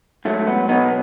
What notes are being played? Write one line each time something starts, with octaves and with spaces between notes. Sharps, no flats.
G#2 F#3 A3
B3
B2 F#3 B3 D#4